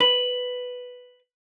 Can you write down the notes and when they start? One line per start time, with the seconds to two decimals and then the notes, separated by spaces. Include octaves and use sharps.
0.01 B4 F#7